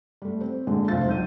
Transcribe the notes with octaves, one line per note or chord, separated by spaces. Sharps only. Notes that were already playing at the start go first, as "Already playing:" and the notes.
G3 A3
C4
A#2 D3 G#3
F1 D2 C3 F3 F5 A6
B1 G6 D#7